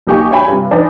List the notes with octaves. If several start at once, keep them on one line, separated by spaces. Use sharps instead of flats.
B1 A#3 D#4 G4 G#5 C#6
D4 C#5 E5 G5 G#5 B5
G2 C3
E3 D4 D#4 D5